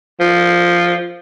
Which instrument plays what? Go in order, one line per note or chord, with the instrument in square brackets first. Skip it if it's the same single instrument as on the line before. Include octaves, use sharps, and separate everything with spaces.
[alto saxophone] F3